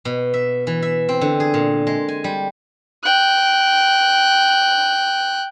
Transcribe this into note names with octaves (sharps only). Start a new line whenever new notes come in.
B2
E5
E3
E5
C4
D3
G#4
A#2
G#3
G#5
G3
G5 F#6